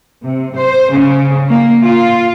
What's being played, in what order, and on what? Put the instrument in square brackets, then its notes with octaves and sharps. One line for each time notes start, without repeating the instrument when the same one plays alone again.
[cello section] C3
C5
C#3
A#3
F4